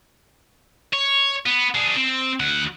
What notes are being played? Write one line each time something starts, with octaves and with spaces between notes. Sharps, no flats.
C#5
B3
D4 G#4
C4
D2 F#5